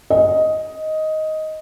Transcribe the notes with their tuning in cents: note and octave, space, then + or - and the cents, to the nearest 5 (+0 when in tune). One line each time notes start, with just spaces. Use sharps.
D#5 +10